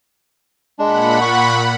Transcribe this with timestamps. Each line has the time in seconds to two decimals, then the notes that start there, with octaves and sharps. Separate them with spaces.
0.79 A#2 G#3 D4 F#5 B5
1.21 C#6